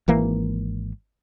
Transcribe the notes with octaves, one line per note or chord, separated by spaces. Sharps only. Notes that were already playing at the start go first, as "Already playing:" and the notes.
G#1 E3 A#3